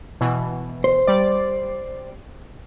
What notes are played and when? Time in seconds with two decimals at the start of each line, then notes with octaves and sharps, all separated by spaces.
0.21 B2 E3
0.84 C5
1.07 G3 D5